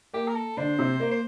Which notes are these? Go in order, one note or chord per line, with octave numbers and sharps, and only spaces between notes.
A#3 G4
A#4
A4
D3 D4 C5
C3 C4
A#3
C5